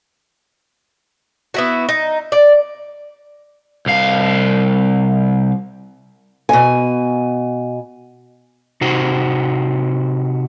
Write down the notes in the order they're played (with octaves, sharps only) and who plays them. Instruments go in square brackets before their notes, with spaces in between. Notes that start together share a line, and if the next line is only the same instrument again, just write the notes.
[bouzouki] B3 E4 F#4
D#4
D5
[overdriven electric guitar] C2 F5
[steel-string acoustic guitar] B2 G#5
[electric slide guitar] C3 D#4 F#4 C5